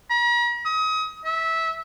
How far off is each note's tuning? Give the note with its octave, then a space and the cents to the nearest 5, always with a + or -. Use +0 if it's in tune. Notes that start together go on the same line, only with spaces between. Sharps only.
A#5 +45
D#6 +30
E5 -15